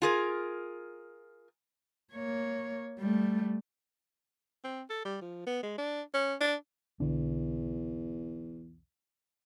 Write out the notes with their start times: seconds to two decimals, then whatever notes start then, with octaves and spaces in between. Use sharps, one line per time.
0.02 F4 G#4 A#4
2.13 A#3 C#5
2.99 G3 A3
4.64 C4
4.90 A4
5.05 G3
5.21 F3
5.47 B3
5.63 G#3
5.78 D4
6.14 C#4
6.41 D4
7.00 B1 E2 D3 D4